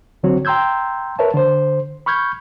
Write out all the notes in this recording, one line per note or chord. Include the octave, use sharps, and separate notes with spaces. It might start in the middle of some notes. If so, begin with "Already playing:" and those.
C2 D3 F#3 C4 F#4 C#5
G5 A#5 C6 E6 G6 G#6
A#4 B4 C#5 E5 A5
D3 C5
B5 C#6 F6 G6 G#6